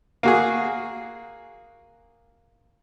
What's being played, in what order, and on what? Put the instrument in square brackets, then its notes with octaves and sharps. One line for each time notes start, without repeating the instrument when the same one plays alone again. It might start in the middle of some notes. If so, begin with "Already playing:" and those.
[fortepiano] A#3 F#4 G#4